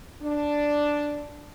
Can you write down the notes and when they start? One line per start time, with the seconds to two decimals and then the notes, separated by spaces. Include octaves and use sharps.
0.22 D4